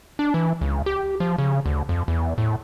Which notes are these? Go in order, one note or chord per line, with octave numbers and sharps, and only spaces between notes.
D4
E3
C#2
G4
F3
C#3
D2
F2
E2
A2